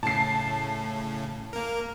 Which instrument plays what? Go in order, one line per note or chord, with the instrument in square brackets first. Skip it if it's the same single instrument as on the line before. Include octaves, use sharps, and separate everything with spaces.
[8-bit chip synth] A2 C#3 [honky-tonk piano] A5 C7
[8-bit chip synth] A#3 A#4